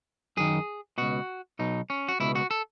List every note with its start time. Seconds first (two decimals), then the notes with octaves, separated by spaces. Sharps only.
0.37 F#2 D#3 G#4
0.98 C#2 B2 F#4
1.59 B1 B2 D#4
1.90 C#4
2.08 F#4
2.20 C#2 B2 E4
2.35 F#4
2.51 A4